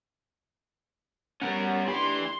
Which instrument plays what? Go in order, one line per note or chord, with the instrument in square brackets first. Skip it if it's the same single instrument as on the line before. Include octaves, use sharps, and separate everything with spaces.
[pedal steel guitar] G3 B3 F#5 [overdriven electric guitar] C#4 A#4
[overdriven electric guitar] E3 B5 [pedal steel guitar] D4 D#4 G4 [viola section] C6